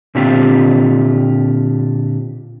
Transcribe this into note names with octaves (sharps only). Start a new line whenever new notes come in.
A#2 D3 C4 F4 G4